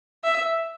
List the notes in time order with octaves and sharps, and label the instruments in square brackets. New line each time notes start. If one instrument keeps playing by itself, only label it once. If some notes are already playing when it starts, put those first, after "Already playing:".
[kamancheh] E5